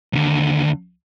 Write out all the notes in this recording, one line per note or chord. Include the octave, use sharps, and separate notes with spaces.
D#2 D3